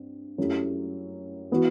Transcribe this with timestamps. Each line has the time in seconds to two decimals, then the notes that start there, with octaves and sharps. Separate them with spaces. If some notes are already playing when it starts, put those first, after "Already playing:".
Already playing: G2 C4
0.38 F#2 F#3 A3 E4 G4
1.51 E3 B3 F#4